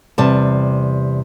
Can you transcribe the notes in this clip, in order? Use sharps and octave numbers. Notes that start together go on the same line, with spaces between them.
E2 C3 G3 A5